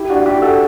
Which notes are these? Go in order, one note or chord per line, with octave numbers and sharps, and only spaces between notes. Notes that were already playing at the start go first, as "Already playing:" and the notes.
Already playing: E4 G4
D4 F#4
F#4
E4 G4
F#4 A4